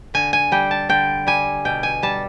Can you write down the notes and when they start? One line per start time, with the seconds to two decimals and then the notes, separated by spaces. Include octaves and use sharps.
0.14 D3 G#5
0.33 G#5
0.52 G3 G5
0.71 A5
0.89 D3 G5
1.27 G3 G#5
1.65 B2 G5
1.83 G#5
2.03 G3 A5